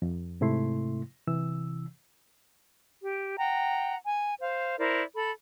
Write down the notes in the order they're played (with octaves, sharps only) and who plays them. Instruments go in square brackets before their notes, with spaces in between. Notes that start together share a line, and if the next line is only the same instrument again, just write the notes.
[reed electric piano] F2
G#2 C3 A3 E4 C6
C3 E3 E6
[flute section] G4
F#5 G5 A#5
G#5
C5 F5
E4 A#4 C5 D5
A4 B5